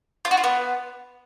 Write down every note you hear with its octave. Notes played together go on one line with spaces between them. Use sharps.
F4
F#4
F4
B3